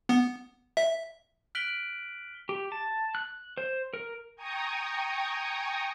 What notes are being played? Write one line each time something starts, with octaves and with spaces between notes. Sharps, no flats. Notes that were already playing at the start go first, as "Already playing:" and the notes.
B3
E5
F6 F#6 B6 D7 F#7 G7
G4
A5
F#6
C5
A#4
G5 G#5 A#5 C#6 D#6